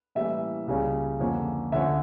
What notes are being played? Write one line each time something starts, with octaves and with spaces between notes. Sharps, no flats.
A2 E3 G3 A#3 C#4 E5
C#2 C#3 G3 A#3 C#4
F2 D3 F3 A#3 C#4
D2 D3 F3 C#4 E5